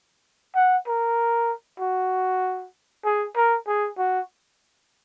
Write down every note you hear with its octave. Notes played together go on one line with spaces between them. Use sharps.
F#5
A#4
F#4
G#4
A#4
G#4
F#4